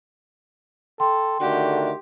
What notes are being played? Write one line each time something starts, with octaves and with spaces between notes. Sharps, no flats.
A4 G5 C6
D3 D#3 A3 F#4 G4